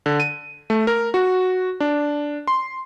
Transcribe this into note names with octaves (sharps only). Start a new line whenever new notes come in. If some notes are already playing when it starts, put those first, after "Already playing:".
D3
D#7
A3
A#4
F#4
D4
C6